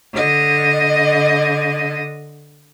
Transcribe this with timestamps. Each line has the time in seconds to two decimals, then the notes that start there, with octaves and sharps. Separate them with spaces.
0.14 D3 D#5